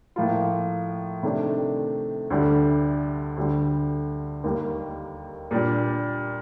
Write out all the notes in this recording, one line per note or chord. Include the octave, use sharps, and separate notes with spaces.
A2 F3 A#3 F4
C3 D#3 A3 D4
D2 D3 G3 D4
D2 D3 G3
D#2 D#3 G3 A#3
A#2 G3 D4